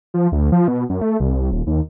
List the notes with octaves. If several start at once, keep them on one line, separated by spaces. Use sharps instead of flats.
F3
D2
F3
B2
F#2
A3
C2
D#1
D#2